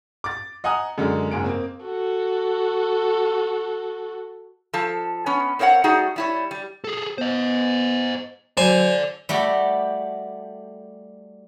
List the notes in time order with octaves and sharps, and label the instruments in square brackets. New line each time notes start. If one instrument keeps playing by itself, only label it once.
[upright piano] D6 A6
D#5 F#5 G#5 A#5 D#6
F#2 D3 G#3
F#1 G#2 G#4 D7
A#3 C4
[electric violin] F#4 A4
[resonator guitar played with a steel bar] F3 A4 A5
B3 C#4
C4 A#4 C#5 E5 F#5
G3 A3 D#4 F#4 G#4 F#5
G3 E4 C#5
G3
[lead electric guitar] G#4 A4
[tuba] B3 [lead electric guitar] C5 D#5
[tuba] F#3 [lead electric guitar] A4 D5 [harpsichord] C5 G#5
[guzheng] G3 A3 F#4 G4